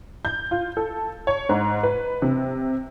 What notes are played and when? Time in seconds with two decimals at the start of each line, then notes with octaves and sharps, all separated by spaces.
0.25 G6
0.51 F4
0.77 A4
1.27 C#5
1.49 G#2
1.83 B4
2.22 C3